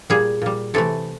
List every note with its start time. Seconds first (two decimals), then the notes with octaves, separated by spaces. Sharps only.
0.10 A#2 G3 G#4
0.42 A#2 G3
0.74 C3 E3 A3 A4